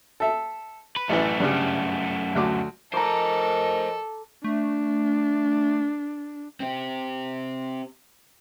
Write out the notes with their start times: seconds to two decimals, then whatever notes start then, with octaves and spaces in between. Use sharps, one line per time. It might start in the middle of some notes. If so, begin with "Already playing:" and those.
0.20 A4 E5
0.96 B4
1.09 A1 F#2 E3 A3
1.40 G2 C#3
2.35 D2 F#3 D6
2.93 F3 A4 A#4 C5 D#5 G#5 A#5 D6
4.44 A3 D4
6.60 C4 G4